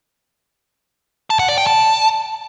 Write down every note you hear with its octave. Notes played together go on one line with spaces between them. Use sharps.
A5
F#5
D5
G5
A5